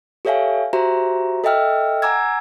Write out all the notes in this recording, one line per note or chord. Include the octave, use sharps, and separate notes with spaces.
G4 A4 C#5 E5 F5 G#5
F#4 G4 C5 E5 A#5
A4 D#5 E5 G5 E6 F6
F#5 G#5 A#5 D6 E6 G#6